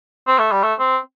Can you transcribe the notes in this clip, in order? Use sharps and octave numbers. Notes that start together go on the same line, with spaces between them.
C4
A3
G3
A3
C4